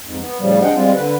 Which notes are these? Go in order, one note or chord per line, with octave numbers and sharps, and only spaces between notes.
F2 G#2
B3
A2 C#3 F3 G3
G#3 D4 G#4 D#5 F#5 G5
F3 G3 G#3 C4 F4
D3 B4